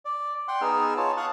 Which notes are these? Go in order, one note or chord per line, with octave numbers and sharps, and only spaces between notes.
D5
F#5 G5 C6
B3 D#4 G#4 E6 F6
F4 C#5 A5
F5 A5 C#6 D#6 F#6